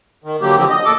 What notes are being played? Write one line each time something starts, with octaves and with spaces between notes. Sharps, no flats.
D#3
D3 F#3 A#3 G4
D3 F3 C4
D#5
A#2 A4 D6